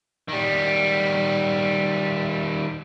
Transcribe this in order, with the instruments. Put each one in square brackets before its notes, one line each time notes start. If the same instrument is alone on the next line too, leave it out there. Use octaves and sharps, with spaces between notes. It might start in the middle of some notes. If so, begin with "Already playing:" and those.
[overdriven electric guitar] D#3 G3